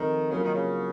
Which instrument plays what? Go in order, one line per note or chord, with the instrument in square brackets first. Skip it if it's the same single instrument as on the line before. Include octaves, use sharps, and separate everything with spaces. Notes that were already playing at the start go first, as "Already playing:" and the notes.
Already playing: [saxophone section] D#3 [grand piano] F3 A3 C4 D#4 F#4
[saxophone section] C#3 [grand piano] F#3 A#3 F4
[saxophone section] D#3
C#3